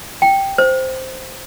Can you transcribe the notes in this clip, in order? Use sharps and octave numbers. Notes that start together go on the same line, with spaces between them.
G5
C5